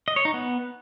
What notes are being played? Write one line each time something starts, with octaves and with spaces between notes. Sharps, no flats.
D#5
C#5
D#4
B3